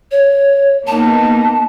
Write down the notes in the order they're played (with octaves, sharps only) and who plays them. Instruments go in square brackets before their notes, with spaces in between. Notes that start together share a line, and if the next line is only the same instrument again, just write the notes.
[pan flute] C#5
[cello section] A#3 B3 D#4 [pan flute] A5